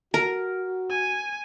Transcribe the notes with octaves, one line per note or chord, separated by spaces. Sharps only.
F#4 A#4
G#5